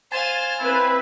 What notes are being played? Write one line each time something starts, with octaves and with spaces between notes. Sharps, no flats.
C5 F5 G#5 A6 E7
C4 E4 B4